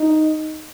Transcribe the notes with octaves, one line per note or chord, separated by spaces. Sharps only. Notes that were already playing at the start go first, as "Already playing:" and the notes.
Already playing: D#4